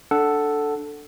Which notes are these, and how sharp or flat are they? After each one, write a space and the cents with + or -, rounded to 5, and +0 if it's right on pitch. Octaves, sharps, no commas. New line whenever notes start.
D4 +0 A4 +0 F#5 +0